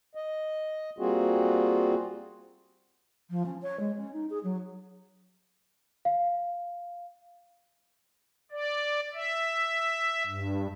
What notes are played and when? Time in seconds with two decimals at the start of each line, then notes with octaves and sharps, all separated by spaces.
0.15 D#5
0.99 G3 A#3 C4 F4 F#4 G#4
3.30 F3
3.45 C#4
3.62 C#5
3.79 G#3
3.97 C#4
4.12 D#4
4.30 G#4
4.43 F#3
6.05 F5
8.51 D5
9.14 E5
10.26 G2